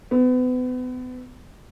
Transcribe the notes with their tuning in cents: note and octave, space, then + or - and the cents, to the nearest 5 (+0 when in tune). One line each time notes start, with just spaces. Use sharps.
B3 +35